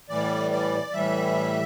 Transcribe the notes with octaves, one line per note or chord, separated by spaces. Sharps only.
A2 E3 G3 D5
D5
A2 E3 G3 E5